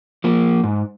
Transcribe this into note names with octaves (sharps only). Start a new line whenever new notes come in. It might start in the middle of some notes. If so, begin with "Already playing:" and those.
F3 A#3
G#2